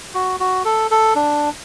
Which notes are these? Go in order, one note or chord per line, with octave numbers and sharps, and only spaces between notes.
F#4
F#4
A4
A4
D4